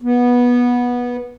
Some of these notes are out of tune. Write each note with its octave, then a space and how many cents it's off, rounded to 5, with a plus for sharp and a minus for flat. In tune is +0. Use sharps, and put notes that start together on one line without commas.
B3 -15